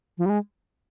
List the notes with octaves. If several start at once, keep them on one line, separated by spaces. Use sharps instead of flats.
F3
G3
G#3